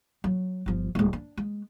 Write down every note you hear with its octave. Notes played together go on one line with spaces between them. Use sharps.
F#3
G1 F3
D#1 G#3
D4
G#3